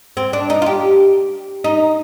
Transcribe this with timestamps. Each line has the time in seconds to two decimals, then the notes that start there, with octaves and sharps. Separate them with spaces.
0.17 C4
0.33 D4
0.50 D#4
0.62 F4
0.66 G4
1.64 D#4